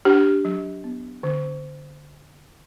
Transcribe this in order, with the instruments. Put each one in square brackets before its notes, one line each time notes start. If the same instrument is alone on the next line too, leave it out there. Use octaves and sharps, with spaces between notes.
[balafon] D4 G4
F#3
B3
D3